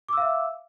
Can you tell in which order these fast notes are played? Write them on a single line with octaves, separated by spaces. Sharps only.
D6 E6 F5 E5